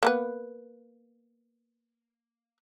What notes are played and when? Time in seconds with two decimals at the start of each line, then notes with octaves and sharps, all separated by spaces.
0.03 A#3 B3 B4